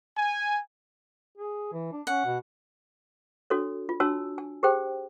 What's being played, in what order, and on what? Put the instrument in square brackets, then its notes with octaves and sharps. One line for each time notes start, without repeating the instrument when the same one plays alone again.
[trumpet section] G#5
[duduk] G#4
E3
D4
[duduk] C#4 [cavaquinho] F#5
[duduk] B2
[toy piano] D4 F#4 A4 C#5
F4
D4 F#4 C#5 G#5 A5 E6
G#5
G4 G#4 C5 G5